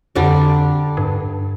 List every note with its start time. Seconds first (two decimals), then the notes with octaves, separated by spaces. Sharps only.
0.15 F2 D3 G3 D4
0.97 G2